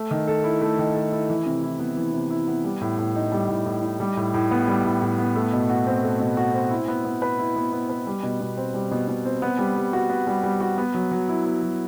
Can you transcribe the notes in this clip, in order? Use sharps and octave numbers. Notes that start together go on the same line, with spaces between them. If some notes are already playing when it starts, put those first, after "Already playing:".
Already playing: A3
D#3
A4
E4
A3
D#3
A4
E4
E3
C3
E4
B3
E3
C3
E4
B3
G3
A2
A2
D#4
G3
A2
A2
D#4
G3
A2
A2
B3
G3
A2
A2
B3
A3
B2
F#4
C4
A3
B2
F#4
C4
E4
B3
B3
B4
E4
B3
B3
B4
G3
B2
B2
C4
G3
B2
B2
C4
B3
G3
G3
F#4
B3
G3
G3
F#4
B3
F#3
F#3
E4
B3
F#3